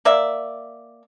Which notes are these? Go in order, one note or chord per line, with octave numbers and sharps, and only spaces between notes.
A#3 D5 E5